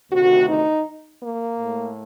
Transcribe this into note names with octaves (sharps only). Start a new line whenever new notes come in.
D2 C3 D#3 A3 F#4
D#4
A#3
A2 A3